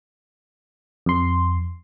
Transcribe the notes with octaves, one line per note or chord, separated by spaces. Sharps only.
F2 C6